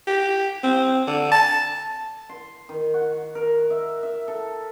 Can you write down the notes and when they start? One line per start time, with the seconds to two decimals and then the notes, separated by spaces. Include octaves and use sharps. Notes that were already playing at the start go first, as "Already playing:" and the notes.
0.07 G4
0.63 C4
1.07 D3
1.31 A5
2.29 C6
2.69 D#3
2.94 F#4
3.35 A#4
3.70 E5
4.03 E5
4.28 A4